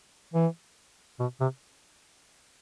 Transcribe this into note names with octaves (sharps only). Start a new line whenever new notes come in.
E3
B2
C3